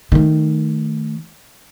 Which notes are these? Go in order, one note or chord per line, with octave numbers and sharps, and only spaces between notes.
D#3 A3